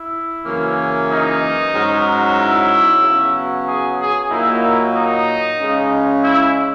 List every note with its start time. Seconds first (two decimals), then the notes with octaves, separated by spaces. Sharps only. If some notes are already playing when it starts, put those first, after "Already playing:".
Already playing: E4
0.45 F#2 C#3 E3 A#3 C#4
1.09 D#4
1.74 G#2 F#3 C#4
2.38 E4
3.02 C#3 F#3 B3
3.67 G#4
3.98 G#4
4.30 A#2 F#3 A#3 D#4 E4
4.95 D#4
5.60 C#3 G#3 C#4
6.23 E4